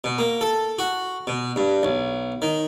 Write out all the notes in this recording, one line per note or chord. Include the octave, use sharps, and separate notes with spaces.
B2
A#3
A4
F#4
B2
G2
B1
D#3